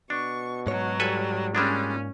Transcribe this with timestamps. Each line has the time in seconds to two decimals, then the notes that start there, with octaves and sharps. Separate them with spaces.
0.10 B2 D4 C#6
0.67 G#2 F#3 C#5
1.00 G3 A4 B4 G#5
1.55 A#2 G3 G#3 C#4 D4